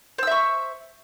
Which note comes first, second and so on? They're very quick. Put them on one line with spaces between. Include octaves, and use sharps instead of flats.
C5 E6 E5 C#6